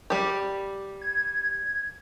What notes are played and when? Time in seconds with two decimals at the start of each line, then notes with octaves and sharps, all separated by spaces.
0.10 G3 G4
1.02 G#6